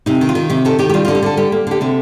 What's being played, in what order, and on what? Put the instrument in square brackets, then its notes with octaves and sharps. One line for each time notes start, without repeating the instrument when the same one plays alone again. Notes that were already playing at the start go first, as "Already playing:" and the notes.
[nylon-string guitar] C3 D#4
D#3
F4
D#3
C3 G4
D#3 A4
D#3 G4
G4
G3 F4
D3 F4
G4
D3 A4
G3 G4
A#3
D3 G4
C3 A4